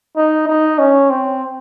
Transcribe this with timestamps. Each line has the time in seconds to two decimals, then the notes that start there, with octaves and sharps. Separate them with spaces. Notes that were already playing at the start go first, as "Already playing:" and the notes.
0.17 D#4
0.48 D#4
0.79 C#4
1.10 C4